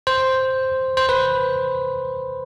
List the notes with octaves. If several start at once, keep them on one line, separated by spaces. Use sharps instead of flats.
C5
C5
B4